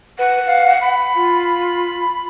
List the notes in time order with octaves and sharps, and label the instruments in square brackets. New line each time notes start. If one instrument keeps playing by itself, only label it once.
[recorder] B4 [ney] F#5
[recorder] F5
B5
[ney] F4